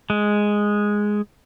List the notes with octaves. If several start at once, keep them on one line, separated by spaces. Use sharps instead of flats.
G#3